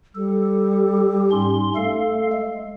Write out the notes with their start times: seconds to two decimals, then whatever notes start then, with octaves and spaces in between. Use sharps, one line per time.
0.15 G3 A4
1.31 G#2 C#4 C6
1.76 A3 A4 F5
2.33 G#3